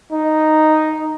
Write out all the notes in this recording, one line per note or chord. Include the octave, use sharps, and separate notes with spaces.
D#4